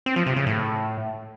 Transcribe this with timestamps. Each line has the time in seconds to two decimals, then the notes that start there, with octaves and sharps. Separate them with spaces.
0.06 C4
0.16 F3
0.26 C3
0.36 C#3
0.46 A2